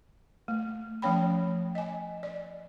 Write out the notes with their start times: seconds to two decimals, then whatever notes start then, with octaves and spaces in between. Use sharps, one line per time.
0.48 A3
1.02 F3 A3 C#4 C#5 G5 B5
1.75 D#5 G#5
2.23 D5